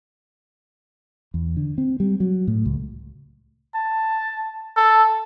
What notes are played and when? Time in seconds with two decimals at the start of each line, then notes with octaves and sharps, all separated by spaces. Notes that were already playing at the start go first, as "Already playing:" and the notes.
1.34 E2
1.57 D3
1.78 C4
2.00 G3
2.20 F#3
2.47 A2
2.65 C#2
3.75 A5
4.76 A4